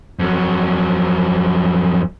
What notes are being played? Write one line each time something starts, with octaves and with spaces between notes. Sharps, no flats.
F2 F#3